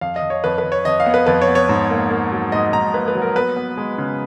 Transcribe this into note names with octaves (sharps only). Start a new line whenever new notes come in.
F2 F5
D#5
F2
C#5
F2 B4
B4
F2
C#5
F2 D#5
F5
B3
B4
F2 B4
C#5
B3
C#5
G#2
A#3
A#3
F#3
G#2 D#5
G#2 A#5
A#3 B4
B4
F#3
A#4
B3 B4
B3
G#3
C#3